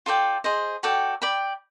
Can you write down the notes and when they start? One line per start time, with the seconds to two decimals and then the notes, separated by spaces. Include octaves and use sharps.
0.06 F4 A4 D5 G5
0.44 G#4 C5 D#5
0.83 F#4 A4 D5 G5
1.22 D5 G5 B5